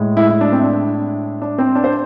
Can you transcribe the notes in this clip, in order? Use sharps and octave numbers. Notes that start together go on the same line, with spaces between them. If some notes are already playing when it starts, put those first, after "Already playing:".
Already playing: A2 G#3
E4
E4
D4
C4
D4
D4
C4
D4
C5